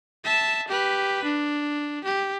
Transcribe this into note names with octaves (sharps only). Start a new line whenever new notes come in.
E5 A5
G4 B4
D4
G4